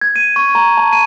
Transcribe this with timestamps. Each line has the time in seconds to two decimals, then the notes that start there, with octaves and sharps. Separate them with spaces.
0.01 G#6
0.16 D#7
0.36 C#6
0.55 A#5
0.78 A5
0.93 D#7